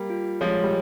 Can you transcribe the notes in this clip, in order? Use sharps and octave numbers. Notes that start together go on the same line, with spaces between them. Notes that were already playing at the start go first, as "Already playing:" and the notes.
Already playing: G3 A#3
F4
F3 G#3 C#5
G3